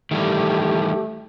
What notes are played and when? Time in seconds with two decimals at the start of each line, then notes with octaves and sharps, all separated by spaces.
0.11 D#3 E3 G3 A3 G4